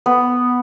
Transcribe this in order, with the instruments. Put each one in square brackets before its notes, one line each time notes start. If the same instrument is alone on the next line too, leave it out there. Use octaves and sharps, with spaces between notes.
[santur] B3